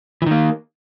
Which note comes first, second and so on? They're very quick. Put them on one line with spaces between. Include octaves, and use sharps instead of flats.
E3 D#3 A#3